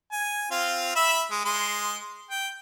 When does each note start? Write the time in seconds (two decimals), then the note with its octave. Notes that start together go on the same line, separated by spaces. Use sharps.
0.12 G#5
0.51 C4 F4 F5
0.95 E5 B5 E6
1.31 G#3
1.45 G#3 C6
2.30 G5